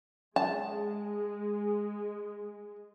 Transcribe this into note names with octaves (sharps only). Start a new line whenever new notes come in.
G#3 A5